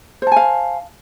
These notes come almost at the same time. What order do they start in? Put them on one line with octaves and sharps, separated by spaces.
C5 A5 G#5 F5